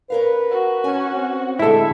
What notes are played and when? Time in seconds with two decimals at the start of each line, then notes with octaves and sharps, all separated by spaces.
0.10 C#4 A#4 B4 F5
0.51 F#4
0.84 C#4 G#5
1.15 C4
1.59 A2 D3 G#3 E4 A4 E5